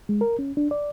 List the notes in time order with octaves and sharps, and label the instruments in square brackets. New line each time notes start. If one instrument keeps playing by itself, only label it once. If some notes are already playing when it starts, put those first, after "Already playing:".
[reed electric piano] G#3
A#4
C#4
D4
D5